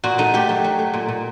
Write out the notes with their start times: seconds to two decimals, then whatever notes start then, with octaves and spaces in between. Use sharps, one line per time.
0.04 A#2 F#4
0.18 A3 D#4
0.34 A3 G4
0.49 F#3
0.64 F#3
0.79 A3
0.93 A#2
1.08 A#2